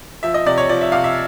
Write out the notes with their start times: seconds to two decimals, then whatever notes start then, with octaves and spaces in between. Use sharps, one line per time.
0.23 F3 E5
0.34 D#5
0.46 C3 D5
0.58 C#5
0.69 F3 D5
0.81 E5
0.92 C3 F5
1.04 E5